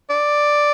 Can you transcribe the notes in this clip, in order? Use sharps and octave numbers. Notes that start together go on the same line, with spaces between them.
D5